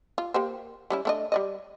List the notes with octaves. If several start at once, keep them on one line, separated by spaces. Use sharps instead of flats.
F4
A#3 G4 C5
G3 C#4 E4
A3 D4 D#5
G3 D5 D#5